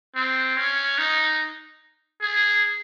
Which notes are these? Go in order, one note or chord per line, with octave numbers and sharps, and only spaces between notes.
C4
C#4
D#4
G#4